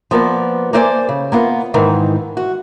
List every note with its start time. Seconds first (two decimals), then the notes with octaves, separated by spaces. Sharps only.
0.11 F3 A#3 B3 D5
0.73 A#3 A4 C5 D5 F5 G#5
1.09 C#3
1.32 A#3 B3 F4
1.74 G#2 D#3 E3
2.37 F#4